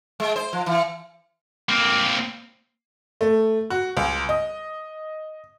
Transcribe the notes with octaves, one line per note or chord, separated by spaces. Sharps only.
G#3
C5
F3
E3
A#3 C4
A3
F#4
C#2
D#5